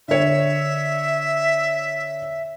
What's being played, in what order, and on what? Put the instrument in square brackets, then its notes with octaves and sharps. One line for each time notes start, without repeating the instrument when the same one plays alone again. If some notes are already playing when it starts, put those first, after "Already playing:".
[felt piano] D3 C#5 [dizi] E5